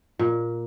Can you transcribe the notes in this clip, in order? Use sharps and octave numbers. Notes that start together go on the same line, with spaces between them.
A#2